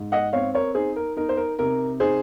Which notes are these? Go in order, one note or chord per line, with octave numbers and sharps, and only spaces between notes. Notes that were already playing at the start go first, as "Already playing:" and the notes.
Already playing: G#2
D#5 F#5
C4 C#5 F5
A#4 C#5
D#4 G#4 C5
A#4
D#4 A#4
C5
A#4
C3 A#4
D#4 G#4 C5